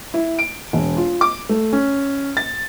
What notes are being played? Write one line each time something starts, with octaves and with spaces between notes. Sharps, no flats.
E4
D7
E1
F4
D6
A3
C#4
A6